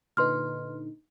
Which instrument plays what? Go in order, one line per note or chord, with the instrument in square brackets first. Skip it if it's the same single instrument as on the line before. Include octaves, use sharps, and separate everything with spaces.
[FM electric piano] A#2 D3 D#4 [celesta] B4 C6 F6